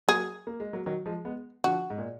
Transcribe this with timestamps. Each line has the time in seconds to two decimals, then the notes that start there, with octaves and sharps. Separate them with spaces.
0.08 F#3 A#3 G#4
0.47 A#3
0.60 G#3
0.73 F#3 A#3
0.86 D#3 F#3
1.06 F3 G#3
1.25 G#3 B3
1.64 D3 F3 F#4
1.90 G#2
1.98 A#2